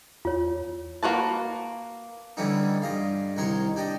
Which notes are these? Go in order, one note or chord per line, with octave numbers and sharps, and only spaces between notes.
E2 F4 C#5
A#3 F#4 B4 A5
D3 E3 G3 B3 C#4 D#4
G2 D#5 F5
C2 D#3 A#4 C#5 C6
D4 G4 D#5